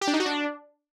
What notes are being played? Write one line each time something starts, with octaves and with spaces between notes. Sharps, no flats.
G4
D4
D#4
F#4
D4